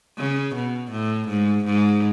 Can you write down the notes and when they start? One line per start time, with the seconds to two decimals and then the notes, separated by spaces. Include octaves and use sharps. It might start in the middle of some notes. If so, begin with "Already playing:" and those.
0.18 C#3
0.55 B2
0.92 A2
1.29 G#2
1.65 G#2